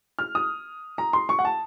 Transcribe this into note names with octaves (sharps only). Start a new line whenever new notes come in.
F6
D#6
A#5
C6
C#6
F#5
A5